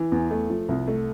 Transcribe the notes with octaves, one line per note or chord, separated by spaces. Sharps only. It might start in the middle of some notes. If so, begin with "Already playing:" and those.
Already playing: E3
E2
A3
F3
C2
A3